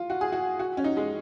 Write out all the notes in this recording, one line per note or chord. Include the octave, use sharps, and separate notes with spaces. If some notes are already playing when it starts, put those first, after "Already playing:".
Already playing: F4
F#4
G#4
F#4
F#4
C#4
D#4
G#3